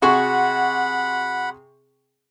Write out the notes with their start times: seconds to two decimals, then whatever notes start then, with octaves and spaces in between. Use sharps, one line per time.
0.02 C3 F#4 G#4 F#5 B5 C#6